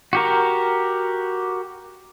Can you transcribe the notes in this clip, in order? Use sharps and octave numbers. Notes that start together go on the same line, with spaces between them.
F#4 G4 A#4